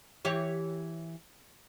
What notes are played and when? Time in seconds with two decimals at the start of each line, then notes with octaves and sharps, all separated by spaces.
0.25 E3 G4 C#5